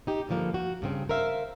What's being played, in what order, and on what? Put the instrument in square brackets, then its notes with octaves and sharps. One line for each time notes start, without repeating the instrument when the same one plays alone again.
[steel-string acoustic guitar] D#4 G4
G2 D3 F3 A#3
F#4
G2 C#3 C4
A#4 C5 E5 F5